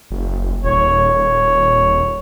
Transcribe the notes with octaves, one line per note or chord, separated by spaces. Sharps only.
F#1
D#1 C#5